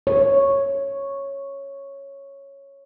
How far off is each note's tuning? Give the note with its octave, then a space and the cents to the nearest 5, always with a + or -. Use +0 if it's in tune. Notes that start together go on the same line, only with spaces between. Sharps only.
C#5 -5